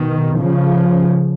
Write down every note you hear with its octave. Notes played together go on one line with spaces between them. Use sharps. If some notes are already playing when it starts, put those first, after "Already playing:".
Already playing: B2 D#3
C#3 F3